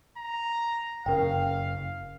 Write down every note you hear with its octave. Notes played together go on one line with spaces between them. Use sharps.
A#5
F#1 C#3 A#4 F5 G5